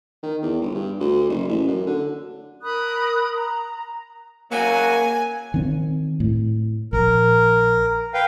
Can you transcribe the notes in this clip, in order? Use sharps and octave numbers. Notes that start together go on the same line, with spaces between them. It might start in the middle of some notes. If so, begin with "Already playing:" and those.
D#3
E2
G1
G2
D2
F#1
A1
F#2
D3
A#4 B5 D#6 F#6
A#5
C#3 E3 F#3 A#3 G#5
D#3 C4
A2
A#1 A#4
B4 F5 G5